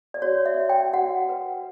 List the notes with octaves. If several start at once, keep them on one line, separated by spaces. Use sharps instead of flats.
D5
F#4 C#5
E5
F#4
G5
F#4 F#5
B4